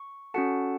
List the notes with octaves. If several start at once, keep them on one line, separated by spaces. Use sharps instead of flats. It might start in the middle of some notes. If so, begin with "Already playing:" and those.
Already playing: C#6
C#4 F#4 A4 F#5 A5